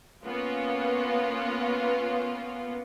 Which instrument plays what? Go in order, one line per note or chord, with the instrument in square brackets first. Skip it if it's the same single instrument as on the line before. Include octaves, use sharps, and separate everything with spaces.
[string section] A#3 B3 C#4 F4